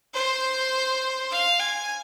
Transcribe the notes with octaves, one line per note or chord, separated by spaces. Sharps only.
C5
F5
G#5